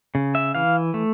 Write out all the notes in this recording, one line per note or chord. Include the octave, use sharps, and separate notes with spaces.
C#3
E5
E3 F5
A3